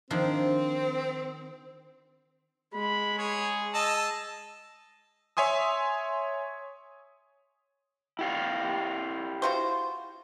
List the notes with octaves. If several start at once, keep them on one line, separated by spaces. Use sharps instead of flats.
D#3 F3 C4 D4
G#3 B5
G#4 C#5
D#5 A5 E6
C#5 E5 G#5 C6 D#6
E4 G4 F5
F4 F#4 C5